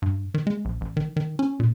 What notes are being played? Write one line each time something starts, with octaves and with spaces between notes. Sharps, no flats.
G2
D#3
G#3
A#1
A1
D#3
D#3
C#4
A#2